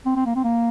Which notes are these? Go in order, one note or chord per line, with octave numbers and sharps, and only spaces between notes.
C4
C4
A#3
C4
A#3